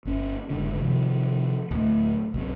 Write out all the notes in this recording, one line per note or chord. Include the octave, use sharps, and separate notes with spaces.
G1 C#4
F#1 G#2 D3
C3 D#3 F3
D1 A3
B1 F#2 C4